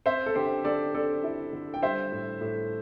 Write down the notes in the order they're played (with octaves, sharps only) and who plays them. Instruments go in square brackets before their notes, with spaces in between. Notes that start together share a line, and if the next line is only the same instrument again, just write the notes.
[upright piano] C4 [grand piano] C5 E5
[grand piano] A4
[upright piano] D3 [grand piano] G4 C5
[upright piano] D3 [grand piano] A4 D5
[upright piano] C4 [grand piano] A4 D5
[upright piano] E4
D3
[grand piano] G5
[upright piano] G3 [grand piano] C5 E5
[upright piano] A2
A2